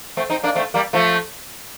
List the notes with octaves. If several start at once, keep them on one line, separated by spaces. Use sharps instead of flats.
A3 C4
C4 D#4
A#3 D4
A3 C4
G3 A#3
F3 A3